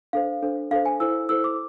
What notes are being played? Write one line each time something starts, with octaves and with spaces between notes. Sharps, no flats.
D4 A4 C5 F5
D4 A4 C5
D4 A4 C5 F5
G#5
E4 A4 C5 E6
E4 A4 C5 E6
D6